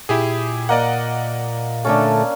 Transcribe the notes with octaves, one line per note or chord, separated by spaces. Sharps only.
A#2 E4 G4 G#4
A#3 D5 D#5 F#5
D3 A3 C#4 D4 A4